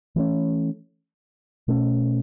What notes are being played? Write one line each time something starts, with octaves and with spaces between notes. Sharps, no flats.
E3 A3 C#4
B2 A3 C#4